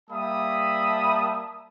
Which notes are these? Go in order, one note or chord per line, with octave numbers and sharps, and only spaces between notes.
G3 A#3 E5 A5 B5 D#6